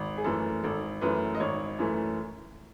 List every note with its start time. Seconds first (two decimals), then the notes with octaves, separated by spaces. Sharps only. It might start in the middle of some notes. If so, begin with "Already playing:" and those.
Already playing: G#1
0.18 G#4
0.24 F#2 E3 A3 A4
0.63 G#1 A4
1.01 F#2 E3 A3 B4
1.35 D#5
1.40 G#1 C#5
1.79 F#2 E3 A3